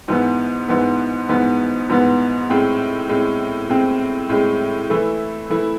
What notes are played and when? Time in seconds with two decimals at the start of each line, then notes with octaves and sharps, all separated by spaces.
0.08 G#2 E3 B3
0.68 G#2 E3 B3
1.29 G#2 E3 B3
1.89 G#2 E3 B3
2.50 A2 G#3 C4
3.09 A2 G#3 C4
3.69 A2 G#3 C4
4.29 A2 G#3 C4
4.90 E3 A3 E4
5.50 E3 A3 E4